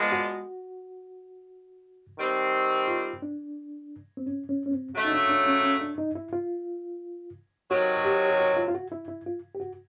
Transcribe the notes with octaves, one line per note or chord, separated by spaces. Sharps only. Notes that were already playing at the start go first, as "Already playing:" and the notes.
Already playing: A#2 F3 G#3 B3
F#4
D#3 G3 C4
F4
D4
C4
C#4
C#4
C#4
C4
C#3 F#3 A3
D#4
D4
D4
C#4
C#4
D4
D#4
E4
F4
C3 D#3 F#3 F#4
G4
F#4
F4
F4
F#4
E4
E4
F4
G4
F#4